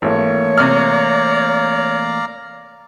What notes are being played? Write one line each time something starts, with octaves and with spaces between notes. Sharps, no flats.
G#1 E3 A3 A#3 C#5
C3 D5 F5 A#5 F6